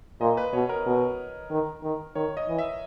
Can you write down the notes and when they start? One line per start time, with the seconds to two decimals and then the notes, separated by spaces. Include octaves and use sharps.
0.21 A#2 D#5
0.37 B4
0.53 B2 C#5
0.69 A#4
0.86 B2
1.50 D#3
1.83 D#3
2.15 D#3 C#5
2.37 D#5
2.48 E3
2.58 E5